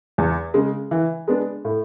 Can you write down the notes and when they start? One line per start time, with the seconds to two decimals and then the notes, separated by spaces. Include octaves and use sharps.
0.18 E2
0.54 C#3 G#3
0.91 E3
1.28 G#3 B3 D4
1.65 A2